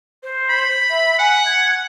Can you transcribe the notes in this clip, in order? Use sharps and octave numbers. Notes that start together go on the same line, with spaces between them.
C5
B5
E5
F#5 G#5
G#6